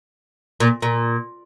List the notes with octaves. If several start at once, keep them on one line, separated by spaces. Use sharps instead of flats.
A#2
A#2